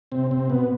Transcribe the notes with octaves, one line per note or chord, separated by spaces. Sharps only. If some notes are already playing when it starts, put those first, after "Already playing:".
C3 C4
C3 C4
B2 B3